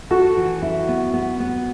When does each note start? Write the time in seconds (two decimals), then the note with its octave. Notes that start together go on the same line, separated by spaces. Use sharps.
0.11 F#4 A4
0.37 E3
0.62 E4
0.88 B3
1.13 B3
1.40 B3